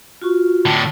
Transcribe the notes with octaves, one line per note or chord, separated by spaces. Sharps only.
F4 F#4 C#6
A2 D3 A5